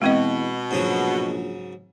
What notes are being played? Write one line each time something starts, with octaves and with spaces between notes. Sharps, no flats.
E2 B2 G#3 C4 D#5
A#1 G#2 C#3 F#3